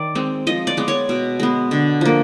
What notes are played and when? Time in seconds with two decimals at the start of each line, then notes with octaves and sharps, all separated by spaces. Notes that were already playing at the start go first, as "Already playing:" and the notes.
Already playing: D#3 D5
0.15 G#3 C4
0.47 F3 D#5
0.67 D5
0.77 G#3 B3
0.88 C#5
1.09 B2
1.40 G#3 B3
1.71 D3
2.01 F3 A#3